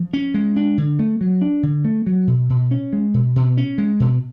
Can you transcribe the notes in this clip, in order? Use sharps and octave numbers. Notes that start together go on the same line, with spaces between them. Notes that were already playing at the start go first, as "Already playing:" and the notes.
Already playing: F3
C#4
G#3
D4
D3
A3
F#3
D4
D3
A3
F#3
B2
B2
C#4
G#3
B2
B2
C#4
G#3
B2